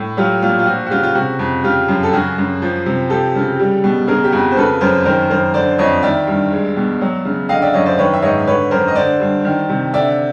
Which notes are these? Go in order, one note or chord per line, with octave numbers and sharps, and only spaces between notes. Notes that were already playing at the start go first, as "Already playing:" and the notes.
Already playing: A2
F#3 F4 G4
A#2 F4
F4
F3 F#4
F#4
C#3 F4 G4
F4
C3 F#4
F2
C#3 F4 G4
F#2
A4
C#3 F#4 G#4
F#2
F3
C3
F3 G4 A4
C#3
G3
B2
C#3 G#4 A#4
G4
F2 F#4
C5
C#3 A4 B4
F#2 A#4 C5
D#3 A#4 C5
F#2 A#4 C5
D3 C5 D5
F2 C#5 D#5
D#3 D5 E5
G2
G#3
B2
F#3
C#3
D3 D#5 F5
D5 E5
F#2 C#5 D#5
C5 D5
D#3 B4 C#5
E5
G#2 C#5 D#5
D3 B4 C#5
F#2 A#4 C5
D#5
D3 C5 D5
G2
D#3
C3
D3 D5 E5